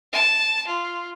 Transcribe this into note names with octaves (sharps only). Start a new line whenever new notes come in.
A5
F4